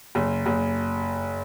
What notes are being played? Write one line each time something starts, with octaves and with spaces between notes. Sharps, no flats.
F#1
F#1